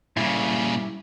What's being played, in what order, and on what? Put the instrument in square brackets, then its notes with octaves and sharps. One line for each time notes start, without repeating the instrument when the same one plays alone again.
[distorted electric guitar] A#2 C#3 [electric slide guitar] G3 E4